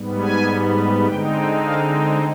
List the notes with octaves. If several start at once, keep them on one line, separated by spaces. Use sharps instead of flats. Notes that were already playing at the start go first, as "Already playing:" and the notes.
Already playing: G#2 G3 B3
G#5
D3 G#3 C4 D#4 G5
G5
F5
D#5